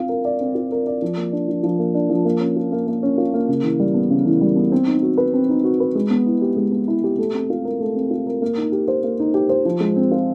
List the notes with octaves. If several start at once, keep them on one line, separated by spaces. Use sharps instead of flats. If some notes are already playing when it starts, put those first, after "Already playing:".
Already playing: C4 F4
A#4
D5
C4
F4
A#4
D5
F3
A#3
D4
F3
F3
A#3
D4
F3
A#3
C#4
F4
A#3
A#3
C#4
F4
A#3
C#3
E3
G3
B3
C#3
E3
G3
B3
C4
D#4
F#4
B4
C4
D#4
F#4
B4
G#3
B3
E4
G4
G#3
B3
E4
G4
A3
C4
F4
A#4
A3
C4
F4
A#4
A#3
D#4
G4
C5
A#3
D#4
G4
C5
F3
G#3
C4
F4